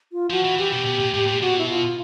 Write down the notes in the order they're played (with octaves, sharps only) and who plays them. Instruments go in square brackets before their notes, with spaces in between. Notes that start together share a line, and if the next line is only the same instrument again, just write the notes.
[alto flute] F4
[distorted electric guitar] F3 [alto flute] F#4
[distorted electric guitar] E3
[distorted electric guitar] E3 [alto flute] G4
[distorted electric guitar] B2
B2
A#2
A2
A#2
[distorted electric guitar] B2 [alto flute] F#4
[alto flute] E4
F4